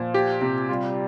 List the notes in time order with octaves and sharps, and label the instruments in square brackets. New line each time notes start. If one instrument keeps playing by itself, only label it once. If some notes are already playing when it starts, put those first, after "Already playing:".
Already playing: [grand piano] A#2 [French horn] F3
[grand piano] G4
C3
[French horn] G3 [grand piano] F4